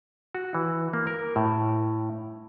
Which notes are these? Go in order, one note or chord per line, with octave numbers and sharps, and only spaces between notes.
F#4
E3
A#3
A#4
A2